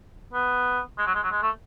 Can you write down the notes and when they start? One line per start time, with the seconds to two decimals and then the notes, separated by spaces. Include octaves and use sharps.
0.33 B3
0.98 G#3
1.06 F#3
1.15 G#3
1.23 F#3
1.31 G#3
1.42 A3